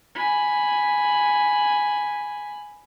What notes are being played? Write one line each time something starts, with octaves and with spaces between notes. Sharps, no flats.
G#5 B5